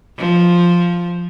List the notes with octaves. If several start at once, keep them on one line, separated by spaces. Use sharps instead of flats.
F3